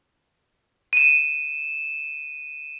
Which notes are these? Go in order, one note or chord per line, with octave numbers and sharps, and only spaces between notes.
D#7 E7